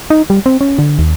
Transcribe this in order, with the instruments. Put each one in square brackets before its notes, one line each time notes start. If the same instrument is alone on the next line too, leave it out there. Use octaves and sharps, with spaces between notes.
[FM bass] D#4
G3
C4
C#4
D3
D#2